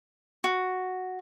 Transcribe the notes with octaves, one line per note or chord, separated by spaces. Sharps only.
F#4